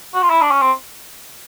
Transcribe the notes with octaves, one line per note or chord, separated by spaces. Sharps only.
F#4
F4
E4
D4
C#4
C4